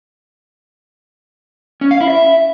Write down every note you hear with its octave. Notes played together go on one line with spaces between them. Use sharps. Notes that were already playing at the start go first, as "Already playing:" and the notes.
C#4
F5
E4
E5